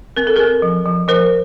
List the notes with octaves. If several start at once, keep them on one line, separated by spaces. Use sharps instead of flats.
C4 A#4
A4
C4 G#4 A#4
F3
F3
F3 A#4 C5